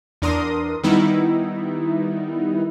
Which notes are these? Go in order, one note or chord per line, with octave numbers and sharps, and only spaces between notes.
E2 D4 A#4 C6 D#6
D#3 G3 B3 D#4 E4